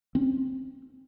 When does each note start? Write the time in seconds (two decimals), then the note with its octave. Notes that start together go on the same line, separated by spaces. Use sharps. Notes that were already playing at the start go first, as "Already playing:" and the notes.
0.15 C4 C#4